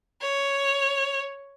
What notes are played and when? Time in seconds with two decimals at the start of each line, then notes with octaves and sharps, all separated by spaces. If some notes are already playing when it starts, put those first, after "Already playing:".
0.21 C#5